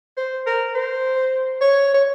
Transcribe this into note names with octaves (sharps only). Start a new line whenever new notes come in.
C5
A#4
C5
C#5
C#5